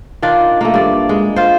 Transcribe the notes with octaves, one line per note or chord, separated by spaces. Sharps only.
D#3 D4 F4 D5
A3 A#3
G2 D5
G#3
F4 C5